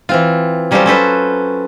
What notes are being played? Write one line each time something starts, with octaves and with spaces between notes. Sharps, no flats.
E3 C4 F4
F#3 G3 C#4 F4 A4 C5
C#4 A4 B4 C5